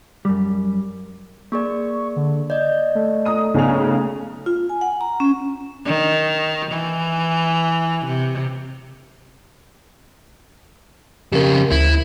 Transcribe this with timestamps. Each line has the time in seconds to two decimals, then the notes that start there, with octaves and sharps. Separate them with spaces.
0.25 F#2 G3
1.52 A#3 G#4 D5 C#6
2.16 D3
2.50 D5 D#5 G6
2.95 A3
3.25 A#5 D#6 D#7
3.54 B1 C#3 G#4 F7
4.46 F4
4.69 G#5
4.81 F#5
5.01 A#5
5.20 C#4
5.85 D#3
6.71 E3
8.06 C3
11.32 F2 C#3 G4 A#4
11.71 D2 E4